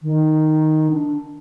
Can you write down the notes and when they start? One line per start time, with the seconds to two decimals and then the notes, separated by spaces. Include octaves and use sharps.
0.02 D#3
0.90 D4